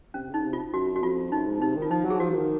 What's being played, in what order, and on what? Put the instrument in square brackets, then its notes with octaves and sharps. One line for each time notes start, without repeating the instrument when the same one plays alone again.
[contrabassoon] C3 [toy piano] C#4
[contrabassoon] C#3 [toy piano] D#4
[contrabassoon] C3
[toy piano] F4
[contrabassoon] F#2 [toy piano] F#4
[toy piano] F#4
[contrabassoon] F2 [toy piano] F4
[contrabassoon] F#2 [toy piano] D#4
[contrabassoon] G#2
[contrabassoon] C3 [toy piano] D#4
[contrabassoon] D#3
[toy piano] F4
[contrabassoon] F3 [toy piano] D#4
[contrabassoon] F#3
[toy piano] G#4
[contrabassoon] F3 [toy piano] F#4
[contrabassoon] F3
D#3